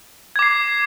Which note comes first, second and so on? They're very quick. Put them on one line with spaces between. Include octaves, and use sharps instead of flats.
G#6 D6 C7